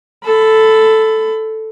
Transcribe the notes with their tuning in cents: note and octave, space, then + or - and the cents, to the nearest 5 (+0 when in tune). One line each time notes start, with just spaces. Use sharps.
A4 +0 B5 +25